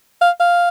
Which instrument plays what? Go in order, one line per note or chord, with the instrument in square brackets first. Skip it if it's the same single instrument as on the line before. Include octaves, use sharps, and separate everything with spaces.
[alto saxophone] F5
F5